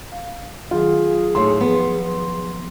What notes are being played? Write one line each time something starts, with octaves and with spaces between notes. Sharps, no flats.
F5
D#3 F#3 F4 G#4
D#2 A2 A3 C6
F3 B3